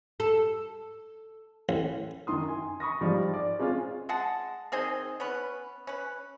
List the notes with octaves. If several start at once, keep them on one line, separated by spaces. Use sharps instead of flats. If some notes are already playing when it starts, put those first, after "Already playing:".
A4
A1
F#2 D#3 C6 D#6
G#5
B5 C#6 D#6 A#6
G#2 F3 G3
D5
G#3 C4 C#4 F4
G#3 F#5 A5
D#3 C4 G#4 D#5
B3 C#4 B4
C#4 B4